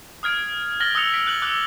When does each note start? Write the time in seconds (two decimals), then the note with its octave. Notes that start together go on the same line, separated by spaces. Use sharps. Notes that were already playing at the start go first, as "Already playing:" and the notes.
0.23 D#6 F6 G#6 D7
0.80 F6 A6 A#6 F#7 G7
0.95 D#6 E6 F#6 C#7 F7
1.14 B6 D7 F#7
1.27 F#6 F#7
1.42 D6 E6 F#6